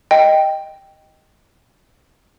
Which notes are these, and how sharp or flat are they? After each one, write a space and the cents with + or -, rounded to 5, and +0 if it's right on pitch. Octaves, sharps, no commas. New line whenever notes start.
D#5 +0 G5 +0